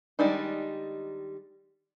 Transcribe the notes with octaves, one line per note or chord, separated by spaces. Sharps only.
D#3 G3 G#3 D4 D#4